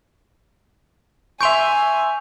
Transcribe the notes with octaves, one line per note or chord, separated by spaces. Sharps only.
E5 G#5 C6 C#6 G6 D7 F7